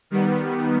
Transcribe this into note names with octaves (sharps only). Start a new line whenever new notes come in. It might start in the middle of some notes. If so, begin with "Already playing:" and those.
D#3 G3 B3